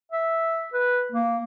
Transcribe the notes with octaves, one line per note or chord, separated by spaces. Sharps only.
E5
B4
A#3